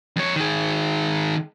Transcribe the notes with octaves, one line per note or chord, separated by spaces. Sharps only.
F2 C#5
D#3 G#4